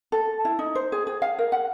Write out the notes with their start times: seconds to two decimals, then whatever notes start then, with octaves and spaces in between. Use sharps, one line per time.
0.12 A4
0.45 E4
0.59 D#4
0.75 C5
0.92 G#4
1.07 G#4
1.22 F5
1.39 A#4
1.52 F#5